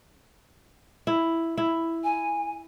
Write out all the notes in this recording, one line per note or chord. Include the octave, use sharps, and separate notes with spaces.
E4
E4
G#5